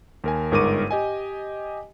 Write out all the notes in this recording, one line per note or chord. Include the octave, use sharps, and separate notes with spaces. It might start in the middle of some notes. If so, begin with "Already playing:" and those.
D#2 A#4 G#5
G1 G#2 A#4 C#6 D6 D#7
G4 D#5 G#5